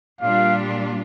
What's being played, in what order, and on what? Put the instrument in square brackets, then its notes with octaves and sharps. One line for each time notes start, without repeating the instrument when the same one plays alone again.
[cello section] A#2 G3 D4 F4 [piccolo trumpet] F5